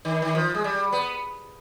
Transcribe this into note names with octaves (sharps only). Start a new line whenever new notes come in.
D#3
D#3
F3
G#3
G3
B3